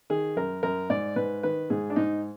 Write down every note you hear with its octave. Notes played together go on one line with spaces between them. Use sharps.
D#3 G#4
F#2 A#4
F#2 A#4
G#2 D5
G#2 B4
D#3 B4
G#2 G#4
D4
G#2 D#4